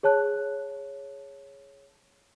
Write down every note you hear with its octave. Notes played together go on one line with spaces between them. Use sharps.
G#4 C#5 A5 F#6